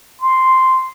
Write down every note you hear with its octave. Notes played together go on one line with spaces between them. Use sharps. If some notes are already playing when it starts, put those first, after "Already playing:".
C6